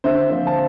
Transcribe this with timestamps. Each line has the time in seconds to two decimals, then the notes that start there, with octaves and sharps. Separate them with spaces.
0.04 D3 C5 E5
0.30 F3 C4
0.47 A5